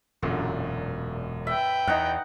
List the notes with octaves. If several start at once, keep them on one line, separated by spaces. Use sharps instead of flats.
E1 F#2 A#2 D3
B4 E5 G5
E2 D#4 F#5